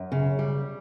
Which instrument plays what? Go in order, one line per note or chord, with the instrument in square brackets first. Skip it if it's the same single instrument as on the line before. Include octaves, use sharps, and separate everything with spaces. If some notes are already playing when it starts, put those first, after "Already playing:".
Already playing: [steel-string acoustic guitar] F#2
C#3
G3